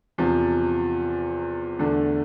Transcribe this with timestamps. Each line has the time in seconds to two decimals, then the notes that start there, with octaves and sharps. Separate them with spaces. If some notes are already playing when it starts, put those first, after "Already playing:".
0.18 E2 C3 F3
1.79 E2 D3 A3 D4